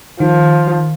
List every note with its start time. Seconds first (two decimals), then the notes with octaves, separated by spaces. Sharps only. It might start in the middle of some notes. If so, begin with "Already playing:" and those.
0.20 D#3 F3